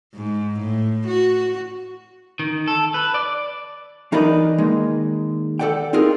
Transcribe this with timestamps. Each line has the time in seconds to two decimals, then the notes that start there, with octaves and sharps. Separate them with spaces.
0.14 G#2
0.60 A2
1.07 F#4
2.39 D#3
2.68 A4
2.94 B4
3.14 D5
4.12 E3 D#4 A#4 B4 D5 D#5
4.58 D#3 G#3 A#3
5.59 A4 B4 D5 F#5 G5
5.93 C4 D#4 F4 G#4 A#4